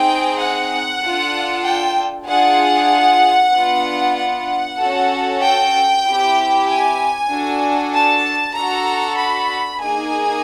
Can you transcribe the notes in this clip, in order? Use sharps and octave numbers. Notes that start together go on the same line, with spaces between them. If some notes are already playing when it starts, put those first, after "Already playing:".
Already playing: C4 D#4 G#4 G5
F#5
D4 F4 A4
G5
D4 F4 G#4 F#5
B3 D4 F4
F#5
C#4 F#4 A4
G5
C4 E4 G4
G#5
D4 F#4 A4
A5
D4 F#4 A4 A#5
B5
A#3 D#4 G#4 G#5